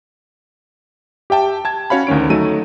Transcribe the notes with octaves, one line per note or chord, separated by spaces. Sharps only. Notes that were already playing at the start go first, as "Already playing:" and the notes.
G4 E5 G5 A5
A5 G#6
C#4 F#4 C#5 F5 B5
D2 D#3 C#4 D7
F#3 A3 D#4 D#7